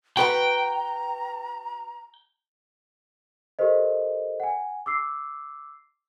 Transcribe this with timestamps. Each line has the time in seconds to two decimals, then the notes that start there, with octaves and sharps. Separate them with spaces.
0.17 F#4 B4 F#5 G5 A#5
3.59 G4 A4 A#4 C5 D#5
4.40 F#5 G#5
4.86 D6 E6 C7